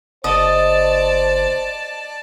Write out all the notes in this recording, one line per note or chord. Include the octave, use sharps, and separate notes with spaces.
F#1 C5 D5 D#5 A5